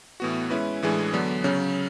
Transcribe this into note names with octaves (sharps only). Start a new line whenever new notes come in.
A2 E3 B3 F#4
G#3 C#4 E4 B4
A2 E3 G#3 D4 G#4
D3 F#3 B3 D4
C#3 F#3 C#4